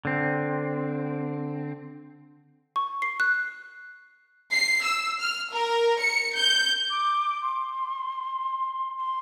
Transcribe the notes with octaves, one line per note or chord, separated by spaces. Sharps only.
D3 C4
C#6
C7
F#6
C7
E6
F6
A#4
C#7
G6
D6
C6
C6